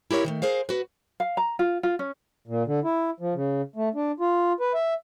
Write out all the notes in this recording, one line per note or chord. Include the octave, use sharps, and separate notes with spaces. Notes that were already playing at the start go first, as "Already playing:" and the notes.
E4 G4 A#4 C#5
D#3 G#3 A3
G#4 A#4 C5 F5
F#4 B4
F5
A#5
F4
F4
C#4
A#2
D3
E4
F3
C#3
A3
D4
F4
B4
E5